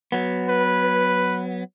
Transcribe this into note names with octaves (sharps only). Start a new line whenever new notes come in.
F#3 B3
B4